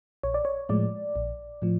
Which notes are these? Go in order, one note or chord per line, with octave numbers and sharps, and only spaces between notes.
A#1 C#5
D5
C#5
A2 F3 G#3 D5
A#1
A2 F3